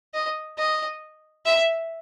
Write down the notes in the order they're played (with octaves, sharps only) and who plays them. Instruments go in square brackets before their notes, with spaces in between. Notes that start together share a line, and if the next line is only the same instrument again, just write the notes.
[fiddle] D#5
D#5
E5